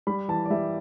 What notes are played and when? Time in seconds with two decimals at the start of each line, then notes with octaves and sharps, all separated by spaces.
0.07 G3 B5
0.28 E3 A5
0.46 D5
0.50 G3 E5